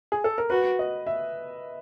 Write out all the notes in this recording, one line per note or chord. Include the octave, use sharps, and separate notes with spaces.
G#4
A4
A#4
F#4 B4
D#5
E5